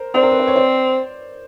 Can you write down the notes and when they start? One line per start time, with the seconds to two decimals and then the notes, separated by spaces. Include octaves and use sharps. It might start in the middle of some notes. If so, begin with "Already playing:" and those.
Already playing: A#4 C5
0.14 C4 C5 D5
0.23 A#4
0.31 B4
0.39 C5
0.47 C#5
0.56 C5 D5